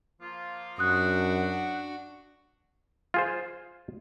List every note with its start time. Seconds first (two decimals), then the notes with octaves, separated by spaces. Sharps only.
0.21 F3 A#3 F4
0.79 F#2 D4 F#4 D#6 F#6
1.24 F#5
3.14 F4 G#4 C5